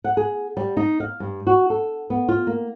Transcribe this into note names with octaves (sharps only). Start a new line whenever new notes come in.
F#5
G#4
G3
D#4
F5
G2
F#4
A4
B3
F4
A#3